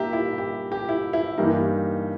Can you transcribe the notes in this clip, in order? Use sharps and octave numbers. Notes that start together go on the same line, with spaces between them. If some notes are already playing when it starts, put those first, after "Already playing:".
Already playing: A#2 A#3 D#4 G4 E5 A#5
E4
G4
G4
E4
E4
G2 E3 A#3 D#4 G4